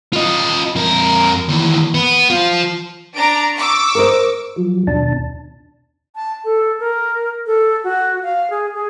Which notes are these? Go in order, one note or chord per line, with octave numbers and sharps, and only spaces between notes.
F4 D#5
F2 A#4
D#2 E3
B3
F3 F4
D4 A#5 D7
C#6 D6 E6
A#4 C5 D#5
F3 F#3
D#2 B2 D4 A5
A5
A4
A#4
A4
F#4
F5
G#4
G#4